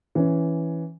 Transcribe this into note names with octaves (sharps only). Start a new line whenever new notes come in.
E3 C#4